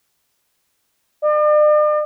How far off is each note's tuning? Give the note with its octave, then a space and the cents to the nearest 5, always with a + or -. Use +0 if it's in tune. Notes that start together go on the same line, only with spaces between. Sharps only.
D5 +45